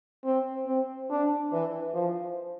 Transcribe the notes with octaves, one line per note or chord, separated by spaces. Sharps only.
C4
C4
D4
E3
F3